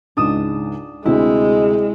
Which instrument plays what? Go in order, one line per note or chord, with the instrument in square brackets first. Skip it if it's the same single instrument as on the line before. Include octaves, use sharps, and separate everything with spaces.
[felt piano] C#2 G#2 [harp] D4 D#6 E7
[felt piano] D2 C3 C4 [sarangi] G#3 [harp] E4